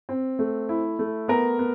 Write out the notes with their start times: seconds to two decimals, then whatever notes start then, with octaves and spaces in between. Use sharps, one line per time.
0.09 C4
0.39 A3
0.69 E4
0.99 A3
1.28 B3 A#4
1.59 B3